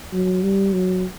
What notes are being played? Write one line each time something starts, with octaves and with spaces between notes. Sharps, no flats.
F#3
G3
F#3